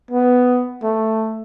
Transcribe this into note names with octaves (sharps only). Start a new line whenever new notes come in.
B3
A3